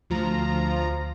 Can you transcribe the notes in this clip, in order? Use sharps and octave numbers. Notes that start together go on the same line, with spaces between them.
D2 F3 F4 A#5